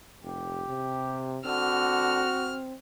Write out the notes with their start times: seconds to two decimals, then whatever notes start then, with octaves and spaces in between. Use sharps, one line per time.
0.23 F1 G4
0.69 C3
1.46 D3 C4 F#4 F6